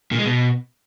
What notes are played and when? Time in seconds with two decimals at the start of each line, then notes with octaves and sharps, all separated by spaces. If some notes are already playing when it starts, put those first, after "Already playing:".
0.12 A#2
0.18 G#3
0.25 B2